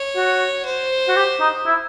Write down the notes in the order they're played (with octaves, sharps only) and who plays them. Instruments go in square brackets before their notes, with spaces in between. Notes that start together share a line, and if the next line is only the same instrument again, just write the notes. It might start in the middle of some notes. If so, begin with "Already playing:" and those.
Already playing: [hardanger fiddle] C#5
[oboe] F#4
[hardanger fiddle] C5
[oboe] F#4
G4
D#4
E4